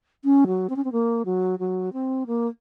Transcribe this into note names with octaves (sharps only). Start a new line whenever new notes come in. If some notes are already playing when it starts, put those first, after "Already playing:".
C#4
F#3
C4
C#4
C4
A#3
F#3
F#3
C4
A#3